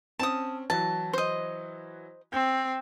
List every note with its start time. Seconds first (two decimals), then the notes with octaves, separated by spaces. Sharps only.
0.19 C4 C#4 A5 D#6
0.70 E3 F#3 F#4 A5
1.13 C5 D#5
2.33 C4 G6